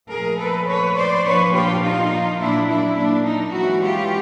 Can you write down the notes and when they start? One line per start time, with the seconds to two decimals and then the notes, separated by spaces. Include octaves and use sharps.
0.10 A#2 F3 A3 G#4 A#4
0.38 A4 B4
0.67 B4 C#5
0.96 C5 D5
1.24 A#2 F3 A#3 D4 B4 C#5
1.53 F4 G4
1.82 D#4 F4
2.39 A#2 F#3 A#3 D4 E4
2.68 D4 E4
2.96 D4
3.25 D#4
3.53 E3 G#3 C#4 E4 F#4
3.81 F4 G4